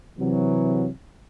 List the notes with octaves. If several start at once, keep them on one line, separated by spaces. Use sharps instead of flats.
C3 E3 F#3